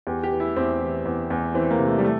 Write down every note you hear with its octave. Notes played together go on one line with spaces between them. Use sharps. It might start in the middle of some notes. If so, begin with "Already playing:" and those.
E2 G4
G4
E3
E4
E2 C4
E3
E2
E2
E3 C4
A#3
C3
A3
G3
A3